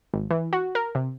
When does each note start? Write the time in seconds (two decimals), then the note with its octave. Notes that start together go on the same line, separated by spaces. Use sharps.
0.14 G#1
0.30 E3
0.53 F#4
0.75 A#4
0.95 C3